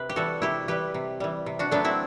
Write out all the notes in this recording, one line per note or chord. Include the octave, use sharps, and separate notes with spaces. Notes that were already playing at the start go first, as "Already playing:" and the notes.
Already playing: C3 B4
G4
E3 G3 F#4 A4
C3 E4 G4
E3 G3 G4 B4
C3
E3 G3
C3
D4 F#4
F#3 A3 B3 D4
C4 E4